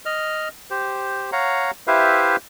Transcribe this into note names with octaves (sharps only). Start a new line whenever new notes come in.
D#5 F6
G4 C5
C#5 F5 F#5 A#5
E4 G4 B4 C5 E5 F5